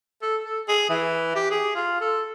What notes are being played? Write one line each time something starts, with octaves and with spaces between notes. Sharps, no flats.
A4
A4
G#4
E3
G4
G#4
F4
A4